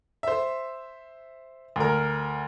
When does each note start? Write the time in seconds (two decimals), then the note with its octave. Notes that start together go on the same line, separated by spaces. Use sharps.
0.23 C5 E5
1.76 D2 A#4